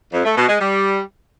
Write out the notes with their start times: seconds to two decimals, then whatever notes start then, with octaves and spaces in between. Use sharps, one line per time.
0.13 F2
0.25 A3
0.37 B2
0.49 G#3
0.61 G3